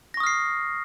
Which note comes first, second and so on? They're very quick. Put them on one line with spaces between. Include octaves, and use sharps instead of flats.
A#6 C#6 D#6 F6 C7